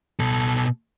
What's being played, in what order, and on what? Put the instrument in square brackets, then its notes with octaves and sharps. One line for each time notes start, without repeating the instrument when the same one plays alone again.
[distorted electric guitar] B2 A4